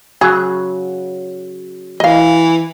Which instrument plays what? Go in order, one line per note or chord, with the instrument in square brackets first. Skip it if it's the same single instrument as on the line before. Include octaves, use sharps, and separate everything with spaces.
[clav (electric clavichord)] C#3 F#3 [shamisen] G#4
[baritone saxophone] E3 [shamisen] D#5 F5